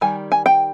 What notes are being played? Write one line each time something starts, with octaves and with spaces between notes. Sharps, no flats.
D#3 G3 G#5
G#5
G5